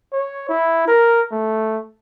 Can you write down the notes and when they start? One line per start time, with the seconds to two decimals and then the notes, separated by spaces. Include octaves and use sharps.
0.12 C#5
0.49 E4
0.87 A#4
1.32 A3